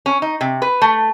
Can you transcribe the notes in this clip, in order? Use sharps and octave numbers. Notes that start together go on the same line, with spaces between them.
C#4
D#4
C3
B4
A3